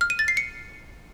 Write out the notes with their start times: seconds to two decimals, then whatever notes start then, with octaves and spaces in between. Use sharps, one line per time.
0.01 F6
0.10 D#7
0.19 A6
0.28 C7
0.37 C#7